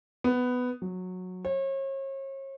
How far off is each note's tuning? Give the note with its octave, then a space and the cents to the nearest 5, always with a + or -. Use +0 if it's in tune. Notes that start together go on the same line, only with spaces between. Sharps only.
B3 +10
F#3 -15
C#5 -40